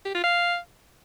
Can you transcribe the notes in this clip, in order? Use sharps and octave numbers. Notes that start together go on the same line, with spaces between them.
G4
F4
F5